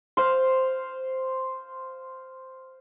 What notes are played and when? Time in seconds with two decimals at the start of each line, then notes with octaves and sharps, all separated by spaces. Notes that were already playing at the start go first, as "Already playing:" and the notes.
0.17 C5 F5